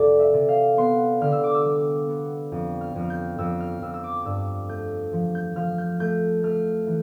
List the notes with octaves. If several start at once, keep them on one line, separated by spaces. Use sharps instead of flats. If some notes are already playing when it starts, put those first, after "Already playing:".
Already playing: F2 C3 A4 D5
E5
C3
F5
B3 C6
D3 F6
E6
D6
E6
G3
B3
F2
F6
F2
F6
G6
F2 E6
F6
F2 E6
E6
D6
G2 E6
A3 G6
F3
G6
F3 F6
G6
A3 G6
A3 F6
E3